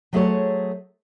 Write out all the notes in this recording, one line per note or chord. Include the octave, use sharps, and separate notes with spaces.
F#3 A3 G#4 A4 C5 C#5